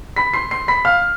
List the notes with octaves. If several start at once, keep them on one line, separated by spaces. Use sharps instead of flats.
B5 B6
C6 C7
C6 C7
B5 B6
F5 F6